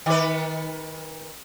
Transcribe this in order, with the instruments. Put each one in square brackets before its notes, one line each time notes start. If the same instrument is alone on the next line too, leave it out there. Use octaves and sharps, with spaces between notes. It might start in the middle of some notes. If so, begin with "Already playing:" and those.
[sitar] D#3 B4